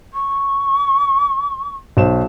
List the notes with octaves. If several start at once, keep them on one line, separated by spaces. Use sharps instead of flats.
C#6
B1 C5 E7